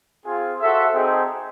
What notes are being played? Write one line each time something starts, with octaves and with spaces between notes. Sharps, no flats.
C4 F4 G#4
F#4 A4 C5 E5
C4 D#4 G#4